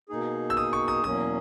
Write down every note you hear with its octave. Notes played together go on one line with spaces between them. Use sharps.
B2 A#3 D#4 G#4
E6
D#6
C#6
D#6
E2 B2 F#3 A#3 C#4 D#6